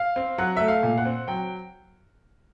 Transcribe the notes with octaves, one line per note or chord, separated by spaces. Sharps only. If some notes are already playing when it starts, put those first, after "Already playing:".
Already playing: F5
C4
F#3 F#5
A3 E5
F5
A#2
F#5
C4
F#3 G5